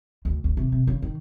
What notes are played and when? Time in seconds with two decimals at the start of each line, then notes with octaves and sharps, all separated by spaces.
0.25 D2
0.44 D2
0.57 C3
0.72 C3
0.87 C#3
1.02 D#3